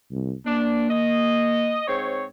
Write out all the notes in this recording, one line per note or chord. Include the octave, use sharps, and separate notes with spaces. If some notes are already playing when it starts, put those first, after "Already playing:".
C2
A#3 D4
D#5
G#2 C4 C#5